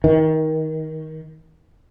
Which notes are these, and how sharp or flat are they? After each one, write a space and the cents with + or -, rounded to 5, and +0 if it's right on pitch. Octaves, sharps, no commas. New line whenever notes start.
D#3 +20